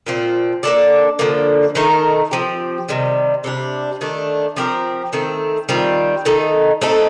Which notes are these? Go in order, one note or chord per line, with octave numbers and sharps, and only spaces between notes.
A#2 F3 C4
A#3 D4 A4 D5
D3 F3 A#3
D#3 A3 D#4 A#4
F3 C4 G4
C3 D#3 G3
C3 G3 D4
D#3 A3 D4
F3 C4 G4 A#4
D#3 A3 C4
D#3 G3 C4 F4
D#3 A3 D#4
A3 C4 D#4 A4